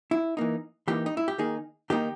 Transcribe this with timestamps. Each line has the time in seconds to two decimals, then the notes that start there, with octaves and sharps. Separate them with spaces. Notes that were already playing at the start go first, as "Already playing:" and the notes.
0.11 E4
0.37 E3 A#3 D#4
0.88 E3 A#3 D#4 G4
1.06 D#4
1.17 E4
1.28 G4
1.38 D#3 A#3 D#4 G#4
1.90 D#3 A#3 D#4 G4